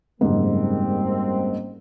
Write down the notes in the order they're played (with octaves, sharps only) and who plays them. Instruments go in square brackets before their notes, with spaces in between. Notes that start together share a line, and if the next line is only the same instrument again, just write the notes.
[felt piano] F#1 G#2 [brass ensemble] G3 A#3 C4